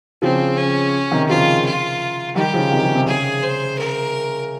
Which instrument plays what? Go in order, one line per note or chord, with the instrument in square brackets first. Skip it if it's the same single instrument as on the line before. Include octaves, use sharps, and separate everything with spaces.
[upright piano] C#3 F3 [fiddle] C4
[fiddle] C#4
[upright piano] C3 D#3
[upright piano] C#3 F3 [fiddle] F4
[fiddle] F4
[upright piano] D#3 G3 [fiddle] G4
[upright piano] C#3 F3
C3 D#3
C#3
C3
[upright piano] C#3 [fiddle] G#4
[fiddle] C5
A#4